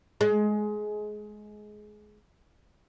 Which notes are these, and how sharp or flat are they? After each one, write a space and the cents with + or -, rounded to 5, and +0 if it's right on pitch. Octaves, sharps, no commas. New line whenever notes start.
G#3 +20